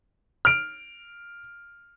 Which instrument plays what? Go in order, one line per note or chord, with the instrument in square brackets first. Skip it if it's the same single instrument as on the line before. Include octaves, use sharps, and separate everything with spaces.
[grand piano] F6 D7